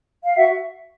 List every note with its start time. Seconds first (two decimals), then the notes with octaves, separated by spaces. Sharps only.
0.24 F5
0.36 F#4 E5 F#5